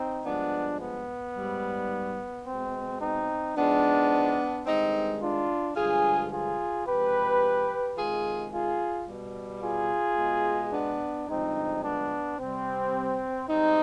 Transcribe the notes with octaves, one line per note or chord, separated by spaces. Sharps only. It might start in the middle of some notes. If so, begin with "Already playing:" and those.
Already playing: C4 D#4
G2 F3 G#3 B3 D4
B3
G#2 G3
B2 G#3 C4
C4 D#4
G#2 F3 G#3 B3 D4
G2 D#3 G#3 C4 D#4
D4 F4
G2 D3 F3 G#3 F4 G#4
F4 G#4
C3 F3 G#3 G4 B4
C3 D#3 G#3 F4 G#4
F4 G#4
B2 G3
F4 G#4
B2 G#3
B3 D4
G2 D3 F3 G#3 C4 D#4
B3 D4
C3 G3 C4
G#2 G3 C4 D#4